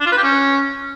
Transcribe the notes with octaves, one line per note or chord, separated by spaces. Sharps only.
D4
F4
B4
G4
C#4